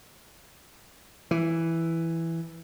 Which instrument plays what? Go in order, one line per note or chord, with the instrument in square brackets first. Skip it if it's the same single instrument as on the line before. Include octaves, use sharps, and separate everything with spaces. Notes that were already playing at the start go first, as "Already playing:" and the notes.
[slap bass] E3